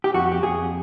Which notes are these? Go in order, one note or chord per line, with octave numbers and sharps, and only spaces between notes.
G4
F2 F#4
G4
F2 G#4